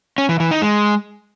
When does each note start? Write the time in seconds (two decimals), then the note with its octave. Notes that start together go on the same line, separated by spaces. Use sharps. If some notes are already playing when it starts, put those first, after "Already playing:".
0.18 C#4
0.29 E3
0.40 E3
0.51 D#4
0.62 G#3